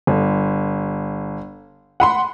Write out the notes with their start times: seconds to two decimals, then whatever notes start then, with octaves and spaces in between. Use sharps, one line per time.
0.07 G1
2.00 F#5 B5 C6